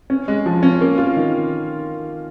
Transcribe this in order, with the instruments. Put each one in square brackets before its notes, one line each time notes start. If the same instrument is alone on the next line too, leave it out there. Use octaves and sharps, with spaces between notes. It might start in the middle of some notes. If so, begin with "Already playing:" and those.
[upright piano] C#4
G#3
F3
C#4
A#3
F4
D#3